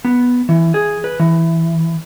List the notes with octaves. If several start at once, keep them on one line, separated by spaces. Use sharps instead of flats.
B3
E3
G#4
B4
E3